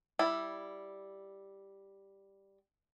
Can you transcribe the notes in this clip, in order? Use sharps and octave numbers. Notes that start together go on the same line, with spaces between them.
G3 E4